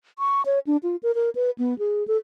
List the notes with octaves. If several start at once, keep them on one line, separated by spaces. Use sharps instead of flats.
C#6
C#5
D4
F4
A#4
A#4
B4
B3
G#4
A4